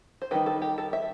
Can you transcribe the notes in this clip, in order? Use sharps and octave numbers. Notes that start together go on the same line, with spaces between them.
C5
D#3 G3 D#4 B4
A4
G4
A4
E5